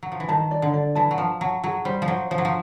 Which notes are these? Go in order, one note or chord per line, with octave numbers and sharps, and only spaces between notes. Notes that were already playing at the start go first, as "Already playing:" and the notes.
F#3
F3
E3
D#3 A5
D5
D3
D5
E3 A5
F#3
F3 A5
F#3 A5
F#3 G#4
G3 C5
F3
F#3 C5
F3 C5
F#3
F3